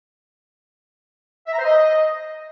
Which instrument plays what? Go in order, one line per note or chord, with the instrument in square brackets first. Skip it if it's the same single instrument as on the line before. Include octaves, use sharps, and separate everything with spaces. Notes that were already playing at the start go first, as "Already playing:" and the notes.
[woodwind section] E5
A#5
C5
D#5